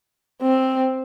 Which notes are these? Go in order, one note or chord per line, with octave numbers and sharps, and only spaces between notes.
C4